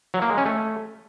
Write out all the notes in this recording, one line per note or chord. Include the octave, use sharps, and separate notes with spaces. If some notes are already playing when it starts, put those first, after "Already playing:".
F#3
A#3
G#3
C#4
A3